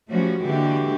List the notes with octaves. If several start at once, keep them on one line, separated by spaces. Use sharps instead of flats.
F3 G3 A3 C#4 F#4
D3 E3 G#3 A#3 F#4 G4